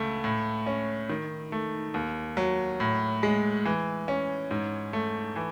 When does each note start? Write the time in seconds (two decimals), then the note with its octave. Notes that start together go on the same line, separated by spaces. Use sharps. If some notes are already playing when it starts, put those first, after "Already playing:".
Already playing: C#2 A3
0.24 A2
0.66 C#4
1.10 D#3
1.52 A3
1.94 D#2
2.37 F#3
2.80 A2
3.23 G#3
3.65 E3
4.08 C#4
4.51 G#2
4.93 A3
5.36 E3